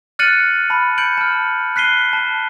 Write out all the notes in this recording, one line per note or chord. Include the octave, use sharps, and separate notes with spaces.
F6 F#6 A6 C#7 D#7 F#7
A5 B5 F6
G6 C#7 D7 F#7
A5 F6
F#6 B6 C7 D#7 G7
A5